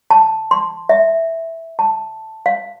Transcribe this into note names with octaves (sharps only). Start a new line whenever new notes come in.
A5
C6
E5
A5
F5